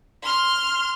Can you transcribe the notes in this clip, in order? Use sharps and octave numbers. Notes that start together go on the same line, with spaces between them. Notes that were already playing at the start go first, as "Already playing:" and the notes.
C6 F6